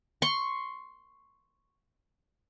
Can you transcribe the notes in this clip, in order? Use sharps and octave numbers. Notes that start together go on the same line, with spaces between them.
C6 C#6